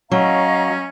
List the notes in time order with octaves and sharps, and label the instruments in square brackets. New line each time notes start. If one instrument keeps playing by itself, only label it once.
[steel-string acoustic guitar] F#3 [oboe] C#4 [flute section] D#5 F5 A#5